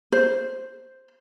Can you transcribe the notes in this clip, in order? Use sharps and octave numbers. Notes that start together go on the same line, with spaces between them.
C5